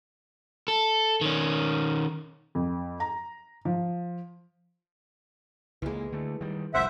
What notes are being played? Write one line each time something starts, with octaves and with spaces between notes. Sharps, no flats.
A4
D#3 C#4
F2
A#5
F3
C#2 E3 G#3 A#3
D3 A3
D#3 G3
F1 C2 A#2 C5 E5 F#5